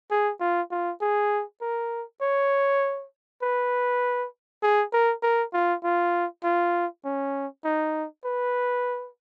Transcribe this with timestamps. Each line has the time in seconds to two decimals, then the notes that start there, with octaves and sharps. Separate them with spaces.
0.11 G#4
0.40 F4
0.71 F4
1.01 G#4
1.61 A#4
2.21 C#5
3.42 B4
4.63 G#4
4.93 A#4
5.22 A#4
5.53 F4
5.84 F4
6.44 F4
7.05 C#4
7.64 D#4
8.25 B4